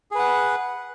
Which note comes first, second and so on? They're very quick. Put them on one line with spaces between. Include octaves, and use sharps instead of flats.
G#4 B4 F#5